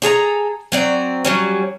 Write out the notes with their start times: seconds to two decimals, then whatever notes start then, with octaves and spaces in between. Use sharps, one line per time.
0.02 D4 G#4 A4 A#5
0.72 F#3 C4 D5
1.25 F#3 G3 C#4